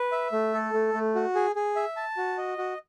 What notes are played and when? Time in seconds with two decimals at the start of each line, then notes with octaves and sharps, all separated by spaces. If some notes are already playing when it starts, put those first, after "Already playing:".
Already playing: B4
0.12 E5
0.32 A3
0.54 A4
0.74 A3
0.94 A3
1.15 F#4
1.35 G#4
1.56 G#4
1.76 E5
1.96 A5
2.17 F#4
2.38 D#5
2.58 F#4